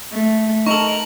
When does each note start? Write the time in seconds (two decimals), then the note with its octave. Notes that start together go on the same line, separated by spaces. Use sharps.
0.13 A3
0.66 D#4 A4 A#4 C#6 F#7